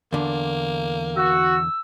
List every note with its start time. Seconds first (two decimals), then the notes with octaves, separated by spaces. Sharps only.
0.13 E2 D3 A#3
1.16 F#4 E6